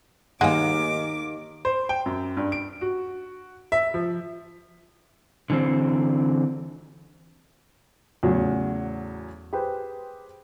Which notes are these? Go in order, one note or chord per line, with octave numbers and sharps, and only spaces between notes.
D#2 D#3 G#3 A#3 F#5 G#5 D6
C5
G5
F#2
G2
D7
F#4
E5
F3
D3 E3 C4
E2 A2 C#3 F#3
G4 G#4 B4 C5